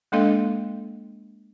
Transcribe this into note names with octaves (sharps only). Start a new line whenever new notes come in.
G#3 A#3 D4 A4 D#5 F5